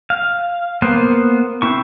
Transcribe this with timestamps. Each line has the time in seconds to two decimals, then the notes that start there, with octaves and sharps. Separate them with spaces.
0.10 F5
0.82 A#3 B3 C5
1.62 C4 E4 C#6